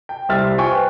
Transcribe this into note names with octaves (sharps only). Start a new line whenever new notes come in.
G5
C2 G4 C5 E5 F6 A6
F4 C5 G5 G#5 C#6
B4